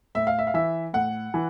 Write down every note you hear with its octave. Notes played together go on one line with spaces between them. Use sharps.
A2 E5
F5
E5
F5
E3 E5
A2 F#5
E3